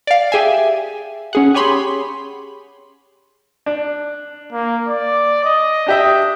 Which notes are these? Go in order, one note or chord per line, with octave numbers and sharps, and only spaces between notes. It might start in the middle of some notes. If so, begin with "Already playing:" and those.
D5 F5
G4 G#4 E5 G#5
C#4 G#4 F#5
G4 G#4 C#5 B5 C6
D4
A#3
D5
D#5
D4 G4 E5